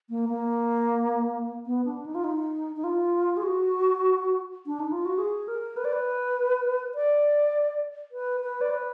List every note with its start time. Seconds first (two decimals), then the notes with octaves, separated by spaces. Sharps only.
0.10 A#3
0.29 A#3
1.66 B3
1.85 D4
2.06 D#4
2.15 F4
2.24 D#4
2.76 D#4
2.84 F4
3.37 G#4
3.43 F#4
4.66 D4
4.80 D#4
4.92 F4
5.05 F#4
5.18 G#4
5.48 A#4
5.77 B4
5.85 D5
5.93 B4
6.95 D5
8.11 B4
8.41 B4
8.61 D5
8.70 B4